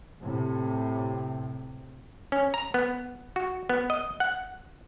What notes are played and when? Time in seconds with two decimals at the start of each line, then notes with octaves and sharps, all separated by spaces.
0.22 A2 C3
2.32 C#4
2.54 A#5
2.74 B3
3.36 F#4
3.69 B3
3.90 D#5
4.20 F#5